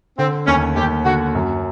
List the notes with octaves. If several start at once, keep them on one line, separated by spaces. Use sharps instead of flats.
D3 C4
D#2 C#4
D#2 G4
D3 F#4
F#2